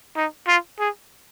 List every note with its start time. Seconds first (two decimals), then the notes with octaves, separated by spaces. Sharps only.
0.16 D#4
0.47 F4
0.79 G#4